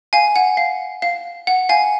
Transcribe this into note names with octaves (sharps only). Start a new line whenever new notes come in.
F5 G#5
F#5
F5
F5
F#5
F5 G#5